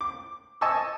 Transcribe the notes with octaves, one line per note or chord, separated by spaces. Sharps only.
D6
D#5 G#5 A5 C#6 D#6 E6